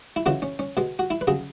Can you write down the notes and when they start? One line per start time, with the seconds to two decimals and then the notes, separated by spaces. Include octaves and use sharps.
0.16 E4
0.26 C#3 E3 G#3 F#4
0.42 C#4
0.59 C#4
0.77 B2 G#3
0.99 F#4
1.10 E4
1.21 B4
1.27 C#3 F#3 G#4